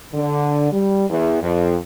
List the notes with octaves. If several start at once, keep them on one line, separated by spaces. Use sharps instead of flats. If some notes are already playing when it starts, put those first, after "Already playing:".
D3
G3
E2
F2